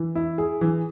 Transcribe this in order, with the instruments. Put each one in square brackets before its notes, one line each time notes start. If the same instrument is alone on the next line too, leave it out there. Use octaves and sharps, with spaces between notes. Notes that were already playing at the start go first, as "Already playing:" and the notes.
Already playing: [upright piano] E3
E4
G#4
E3